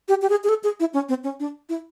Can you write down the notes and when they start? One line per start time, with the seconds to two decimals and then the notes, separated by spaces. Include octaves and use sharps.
0.08 G4
0.22 G4
0.30 G#4
0.44 G#4
0.49 A4
0.64 G#4
0.80 E4
0.94 C#4
1.09 C4
1.24 C#4
1.40 D4
1.69 E4